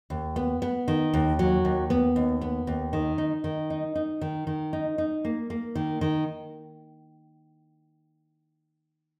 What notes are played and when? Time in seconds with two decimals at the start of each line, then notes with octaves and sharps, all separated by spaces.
0.10 D#2
0.36 B3
0.62 B3
0.88 D#3
1.14 D#2
1.39 F#3
1.65 D#2
1.90 B3
2.16 D#2
2.41 B3
2.67 D#2
2.93 D#3
3.18 D#4
3.44 D#3
3.70 D#4
3.95 D#4
4.21 D#3
4.47 D#3
4.73 D#4
4.98 D#4
5.25 A#3
5.50 A#3
5.75 D#3
6.01 D#3